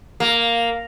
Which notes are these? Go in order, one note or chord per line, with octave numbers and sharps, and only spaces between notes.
A#3